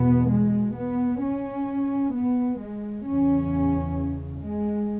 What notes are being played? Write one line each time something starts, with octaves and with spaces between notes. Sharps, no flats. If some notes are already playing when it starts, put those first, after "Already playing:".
Already playing: E2 B2 B3
G#3
B3
C#4
B3
G#3
E2 C#3 C#4
G#3